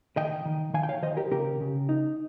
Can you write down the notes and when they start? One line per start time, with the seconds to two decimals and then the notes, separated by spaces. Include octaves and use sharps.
0.17 D#3 D#5 G5
0.45 D#3
0.74 D#3 F5 G#5
0.83 G5
0.89 C#5 F5
1.02 D#3 C5 D#5
1.17 G4 A#4
1.31 C#3 G4 A#4
1.61 C#3
1.89 D#4